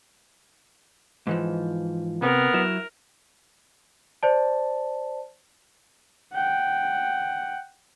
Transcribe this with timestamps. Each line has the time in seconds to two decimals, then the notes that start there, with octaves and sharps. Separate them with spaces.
1.27 G#2 E3 F3
2.22 C3 B3 A#4
2.54 F#3 E4
4.23 C5 D5 A5
6.33 F#5 G5